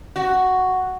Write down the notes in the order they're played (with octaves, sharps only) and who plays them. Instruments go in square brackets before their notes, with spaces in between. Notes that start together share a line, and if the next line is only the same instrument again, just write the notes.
[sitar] F#4